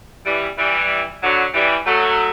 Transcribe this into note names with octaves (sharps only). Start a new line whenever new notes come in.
E3 G3
E3 G3
D3 F#3
E3 G3
F#3 A3